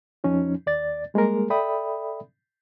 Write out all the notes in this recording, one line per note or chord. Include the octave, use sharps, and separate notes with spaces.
F2 F3 C#4 D#4
D#2 D5 A6
G3 G#3 A#3 G#4 A#4
A4 D5 E5 G5 B5 D#6